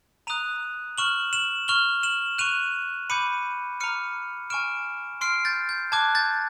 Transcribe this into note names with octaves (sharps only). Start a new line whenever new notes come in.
A#5 D#6 F#6 D#7 F7
C#6 F6 E7 F#7
E7 F#7
C#6 F6 F7 G7
E7 F#7
C#6 F#6 D#7 F7
B5 D6 G6 C#7 D#7
A#5 D6 F6 C#7 D#7
G#5 C#6 F6 D7 E7
C6 F6 C7 D7
G6 A6
G6
A5 D6 F#6 G#6
G6 A6